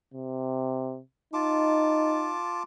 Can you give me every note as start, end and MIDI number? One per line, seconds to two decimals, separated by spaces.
0.14 1.00 48
1.34 2.37 63
1.34 2.63 65
1.34 2.63 81
1.34 2.63 86